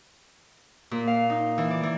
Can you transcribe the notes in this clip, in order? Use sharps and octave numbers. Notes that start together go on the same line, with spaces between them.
A#2
F5
D#4
E3
D5
E3